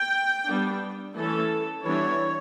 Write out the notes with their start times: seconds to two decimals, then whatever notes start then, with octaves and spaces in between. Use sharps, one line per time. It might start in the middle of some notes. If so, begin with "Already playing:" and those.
Already playing: G5
0.47 G3 B3 D4
1.15 E3 A3 C#4 A4
1.83 E3 G3 B3 D4 C#5